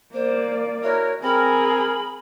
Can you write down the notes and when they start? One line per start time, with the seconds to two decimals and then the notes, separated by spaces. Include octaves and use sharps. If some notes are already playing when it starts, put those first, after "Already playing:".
0.14 A#3 C5 D5
0.83 E4 F#4 A#4 C#5
1.23 C4 G#4 A#4 B5